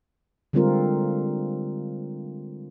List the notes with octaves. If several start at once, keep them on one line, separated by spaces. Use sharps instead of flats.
D3 G3 G#3 C4 F4 A#4